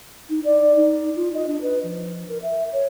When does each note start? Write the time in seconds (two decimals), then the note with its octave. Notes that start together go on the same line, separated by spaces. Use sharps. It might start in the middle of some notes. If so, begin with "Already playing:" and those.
0.29 D#4
0.44 D5
0.76 D#4
1.15 F4
1.34 D#5
1.46 D4
1.61 B4
1.83 F3
2.28 A#4
2.43 E5
2.72 C#5